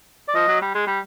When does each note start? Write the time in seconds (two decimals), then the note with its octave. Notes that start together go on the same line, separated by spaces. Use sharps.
0.28 D5
0.34 F3 D#5
0.48 F#3
0.61 G3
0.74 G#3
0.87 G3